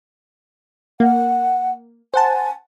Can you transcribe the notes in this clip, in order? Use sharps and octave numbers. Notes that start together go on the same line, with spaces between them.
A#3 F#5
C5 F#5 G#5 A5